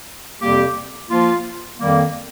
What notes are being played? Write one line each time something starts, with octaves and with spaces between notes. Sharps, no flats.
F2 C3 G3 A#3 G4
F3 A#3 F4
F2 D#3 G3 A#3